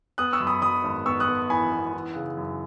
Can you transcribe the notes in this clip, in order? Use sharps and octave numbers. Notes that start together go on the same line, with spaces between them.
B3 D#6 F#6
C#6 E6
F#2
B5 D#6
F#2 B5 D#6
G#1
B3 C#6 E6
D#6 F#6
B3
E3 G#5 B5
B3
E3
C#3
F#2